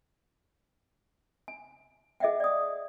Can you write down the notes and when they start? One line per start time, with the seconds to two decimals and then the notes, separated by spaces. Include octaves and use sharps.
1.48 G#5
2.20 G#4 D#5 E5 F#5 G5
2.40 D5 D#6